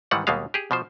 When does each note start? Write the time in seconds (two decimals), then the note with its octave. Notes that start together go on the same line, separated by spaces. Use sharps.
0.11 G#2 D#3 E3 G3 F#5
0.27 D#2 B2 G3 G#3 F5
0.54 G4 G#4
0.71 B2 F3 C5